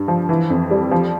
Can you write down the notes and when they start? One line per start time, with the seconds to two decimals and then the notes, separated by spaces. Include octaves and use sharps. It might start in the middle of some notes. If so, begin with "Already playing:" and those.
Already playing: G2
0.08 F3
0.29 E3
0.50 F2
0.71 G3
0.91 F3